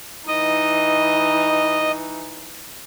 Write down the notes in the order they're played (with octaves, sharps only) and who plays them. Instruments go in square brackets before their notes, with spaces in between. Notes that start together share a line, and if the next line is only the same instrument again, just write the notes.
[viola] E3 D#4 [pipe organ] D#5